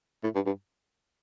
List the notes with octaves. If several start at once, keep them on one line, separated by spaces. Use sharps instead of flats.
A2
G2
G2